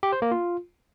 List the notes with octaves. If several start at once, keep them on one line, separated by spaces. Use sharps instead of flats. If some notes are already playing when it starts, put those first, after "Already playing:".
G4
C5
A#3
F4